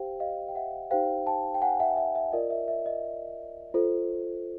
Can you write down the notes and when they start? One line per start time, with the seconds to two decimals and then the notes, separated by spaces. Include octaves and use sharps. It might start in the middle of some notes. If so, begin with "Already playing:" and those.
Already playing: G4 C5 F5 G5
0.20 D#5 F5
0.48 G5
0.55 E5 F#5
0.91 D#4 G4 C5 F5 G5
1.27 G5 A5
1.54 G5
1.61 F#5 G#5
1.80 E5 F#5
1.97 E5
2.15 E5
2.32 F4 A#4 D5 D#5
2.50 E5
2.68 E5
2.86 D#5
3.74 F4 A4 C5